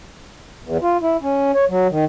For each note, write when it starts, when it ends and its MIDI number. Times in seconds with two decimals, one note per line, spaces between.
0.63 0.77 40
0.82 0.97 65
1.01 1.17 64
1.22 1.52 61
1.54 1.65 73
1.69 1.87 54
1.90 2.05 51